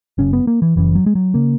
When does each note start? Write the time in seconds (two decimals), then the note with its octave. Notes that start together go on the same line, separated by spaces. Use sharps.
0.18 F#1 F#2 C#3 C#4
0.33 B3
0.47 A#3
0.62 E3
0.76 F#1 F#2 C#3 E3
0.95 F#3
1.06 G#3
1.15 F#3
1.34 C#3 A#3